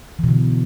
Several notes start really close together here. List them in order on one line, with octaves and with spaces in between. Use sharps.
E3 B2 D3